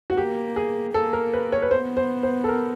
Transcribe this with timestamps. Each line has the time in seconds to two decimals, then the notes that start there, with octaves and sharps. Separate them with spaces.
0.10 F#4
0.17 A#3 G4
0.56 G#4
0.94 A#3 A4
1.13 A#4
1.33 B4
1.52 C#5
1.62 B4
1.71 B3 C5
1.97 C5
2.23 C5
2.44 A4
2.49 A#4